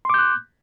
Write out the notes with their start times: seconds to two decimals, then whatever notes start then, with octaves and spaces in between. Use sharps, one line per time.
0.05 C6
0.10 D6
0.14 G6
0.19 F#6